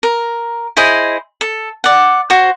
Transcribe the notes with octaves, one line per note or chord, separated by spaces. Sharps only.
A#4
E4 G#4 C5 D#5
A4
D5 F#5
F#4 C5